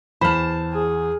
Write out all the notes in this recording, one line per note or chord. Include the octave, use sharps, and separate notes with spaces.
E2 C5 A5 B5 F6
G#4